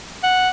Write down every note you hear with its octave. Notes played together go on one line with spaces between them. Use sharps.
F#5